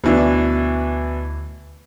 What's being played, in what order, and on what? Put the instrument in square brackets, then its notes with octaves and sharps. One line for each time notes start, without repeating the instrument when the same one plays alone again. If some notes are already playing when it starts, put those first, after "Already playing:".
[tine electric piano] D2 [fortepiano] B2 E3 D4